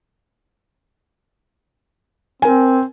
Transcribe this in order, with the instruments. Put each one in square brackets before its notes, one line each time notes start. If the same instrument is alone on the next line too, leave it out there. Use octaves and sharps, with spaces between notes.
[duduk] C4 [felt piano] A#4 G#5